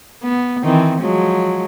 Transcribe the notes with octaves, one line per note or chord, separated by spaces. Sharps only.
B3
D#3 E3 C4
F3 F#3 G#3